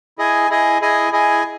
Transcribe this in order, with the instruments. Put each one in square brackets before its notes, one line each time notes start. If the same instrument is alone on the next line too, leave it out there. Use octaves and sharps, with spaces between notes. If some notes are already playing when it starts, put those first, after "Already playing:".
[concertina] E4 G#4 D#5 G#5
E4 G#4 D#5 G#5
E4 G#4 D#5 G#5
E4 G#4 D#5 G#5